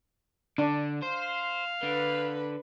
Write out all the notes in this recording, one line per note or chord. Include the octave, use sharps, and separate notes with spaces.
D3 D4
C5 F5
D3 B4